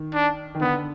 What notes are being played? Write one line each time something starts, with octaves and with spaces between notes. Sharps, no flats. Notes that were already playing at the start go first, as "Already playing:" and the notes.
Already playing: D#3
D4
D#3
D3 B3